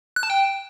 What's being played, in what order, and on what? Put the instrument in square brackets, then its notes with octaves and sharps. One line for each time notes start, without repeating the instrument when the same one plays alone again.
[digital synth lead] F#6
A5
G5